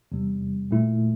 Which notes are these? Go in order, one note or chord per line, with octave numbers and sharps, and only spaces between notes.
E2 C3 G3
A#2 A3 E4